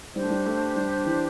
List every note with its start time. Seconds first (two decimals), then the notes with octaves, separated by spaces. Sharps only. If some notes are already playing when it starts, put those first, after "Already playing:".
0.15 G3 D4 G4 C5
0.23 A3
0.30 G3
0.46 A3
0.76 G3
1.06 E3